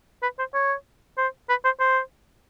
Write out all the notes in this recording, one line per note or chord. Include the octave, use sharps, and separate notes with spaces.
B4
C5
C#5
C5
B4
C5
C5